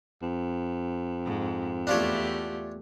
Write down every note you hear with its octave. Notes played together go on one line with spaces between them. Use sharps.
F2
G#2
E2 A3 D4 F4 G4 C#5